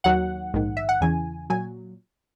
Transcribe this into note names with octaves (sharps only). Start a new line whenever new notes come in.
D#2 D#3 F#3 F#5
A#1 G#2 D#3
E5
F#5
E2 C#3 E3 G#5
A#2 F#3 G#5